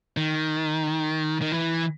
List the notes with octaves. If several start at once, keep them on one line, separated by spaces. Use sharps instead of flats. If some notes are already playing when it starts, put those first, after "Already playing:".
D#3
D#3
E3